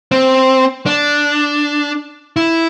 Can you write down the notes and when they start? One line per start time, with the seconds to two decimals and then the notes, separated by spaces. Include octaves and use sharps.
0.11 C4
0.86 D4
2.36 E4